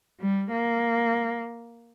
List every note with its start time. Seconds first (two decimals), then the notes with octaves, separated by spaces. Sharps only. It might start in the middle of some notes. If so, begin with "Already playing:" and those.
0.19 G3
0.51 A#3